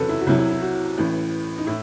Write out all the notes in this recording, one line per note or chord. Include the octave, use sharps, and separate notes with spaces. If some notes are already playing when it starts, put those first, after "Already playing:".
Already playing: F#1 E2 C3 F#3 A4 B4
E4
F#4
C2 C3 F#3 E4
E4
E4
F#4
A1 A2 E3
D#4
A2 E4